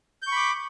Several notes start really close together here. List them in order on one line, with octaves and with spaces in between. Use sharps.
G6 C#6 B5 D6